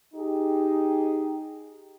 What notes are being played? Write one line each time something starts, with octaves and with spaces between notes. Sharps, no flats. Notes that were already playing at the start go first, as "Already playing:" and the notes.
D#4 G4 G#4